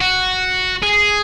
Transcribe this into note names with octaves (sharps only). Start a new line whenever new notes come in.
F#4
G#4